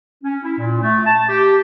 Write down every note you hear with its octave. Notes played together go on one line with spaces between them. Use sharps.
C#4
E4
A#2
A3
A5
G4